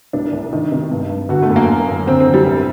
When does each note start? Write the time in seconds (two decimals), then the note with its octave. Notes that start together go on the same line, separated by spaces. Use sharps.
0.13 C2 D4
0.32 C2
0.53 D#3
0.72 C3
0.91 G2
1.10 G2
1.29 D3 F#4
1.42 A3
1.50 F#2
1.56 A#3
1.69 F#2
1.88 F#2
2.07 D3 C4
2.20 C4
2.27 D3
2.34 G3
2.46 C2